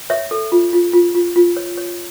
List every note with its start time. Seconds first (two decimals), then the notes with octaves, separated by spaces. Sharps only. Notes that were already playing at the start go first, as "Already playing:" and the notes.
0.10 C#5 E5
0.31 A4
0.52 F4
0.73 F4
0.93 F4
1.15 F4
1.36 F4
1.57 C#5
1.77 C#5